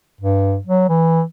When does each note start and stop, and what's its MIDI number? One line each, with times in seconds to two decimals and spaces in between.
0.21 0.57 43
0.67 0.85 54
0.89 1.23 52